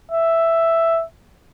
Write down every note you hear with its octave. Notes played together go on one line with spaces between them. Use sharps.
E5